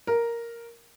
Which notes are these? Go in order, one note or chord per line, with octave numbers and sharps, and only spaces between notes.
A#4